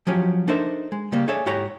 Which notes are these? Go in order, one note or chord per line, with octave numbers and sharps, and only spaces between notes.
F3 F#3 C#4 G4
D4 D#4 A4 A#4 C5 E5
G#3
C#3 G3 A#3
G#4 A4 C#5 D5 E5 G#5
G#2 E4 F#4 G4 C#5 A#5